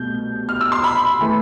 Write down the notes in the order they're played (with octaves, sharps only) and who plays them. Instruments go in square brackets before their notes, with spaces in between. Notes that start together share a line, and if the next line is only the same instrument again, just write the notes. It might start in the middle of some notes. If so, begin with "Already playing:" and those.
Already playing: [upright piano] C2 B2 A3 G6
F6
E6
C6
B5
E3 A3